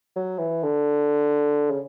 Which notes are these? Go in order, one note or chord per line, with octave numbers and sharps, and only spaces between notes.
F#3
E3
D3
C#3